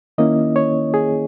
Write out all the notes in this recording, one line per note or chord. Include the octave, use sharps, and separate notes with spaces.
D#3 A#3 C#4 E4 D#5
C#5
G#4